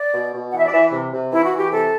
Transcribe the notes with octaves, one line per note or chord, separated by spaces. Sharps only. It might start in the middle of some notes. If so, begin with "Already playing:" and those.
Already playing: D5
B2
B2
E3 F#5
E5
D5
E3 E5
C3
C3
E3 E4
F#4
E3
G4
C3 A4